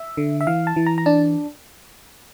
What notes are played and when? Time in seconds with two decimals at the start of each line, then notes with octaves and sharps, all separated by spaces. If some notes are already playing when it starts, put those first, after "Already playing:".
Already playing: E5
0.17 D3
0.41 E5
0.47 E3 F5
0.67 A5
0.76 E3
0.86 A#5
0.98 A#5
1.06 D4 A5